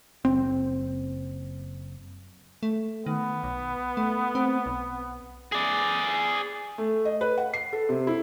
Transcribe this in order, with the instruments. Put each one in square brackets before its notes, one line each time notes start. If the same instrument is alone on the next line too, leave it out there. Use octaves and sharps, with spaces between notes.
[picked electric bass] F#1 C4
[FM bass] A3
[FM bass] D#3 [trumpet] B3
[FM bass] B1
A3
C4
B1
[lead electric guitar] G#4 D5
[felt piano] A3
D#5
B4
F#5
C7
A4
C3
E4